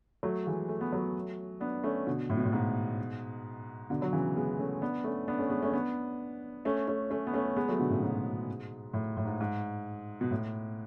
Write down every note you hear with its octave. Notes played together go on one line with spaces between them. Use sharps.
F#3 A3
E3 G#3
A3
B3
F#3 A3
B3 D4
A3 C#4
B2 D3
A2
B2
A2
G#2 B2
B2 D3
F#3
C#3 E3
G#3 B3
A3 C#4
B3 D4
A3 C#4
B3 D4
A3 C#4
G#3 B3
A3 C#4
B3 D4
A3 C#4
A3 C#4
A3 C#4
B3
A3 C#4
G#3 B3
F#3 A3
B2 D3
A2 C#3
G#2 B2
A2
A2
G#2
G#2
B2
A2